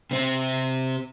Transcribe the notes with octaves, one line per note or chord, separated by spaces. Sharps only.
C3 C4